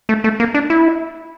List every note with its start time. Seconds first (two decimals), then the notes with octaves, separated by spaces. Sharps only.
0.09 A3
0.24 A3
0.40 A#3
0.54 D4
0.70 E4